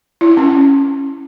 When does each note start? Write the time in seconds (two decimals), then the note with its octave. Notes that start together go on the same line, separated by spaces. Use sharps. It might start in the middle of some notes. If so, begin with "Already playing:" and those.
0.21 E4
0.37 C#4